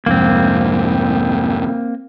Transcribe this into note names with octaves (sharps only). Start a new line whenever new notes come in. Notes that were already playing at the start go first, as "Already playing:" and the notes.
C2 F2 G#2 A#3 C4